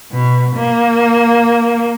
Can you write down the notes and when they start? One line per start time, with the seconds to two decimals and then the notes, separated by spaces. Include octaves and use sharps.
0.11 B2
0.56 A#3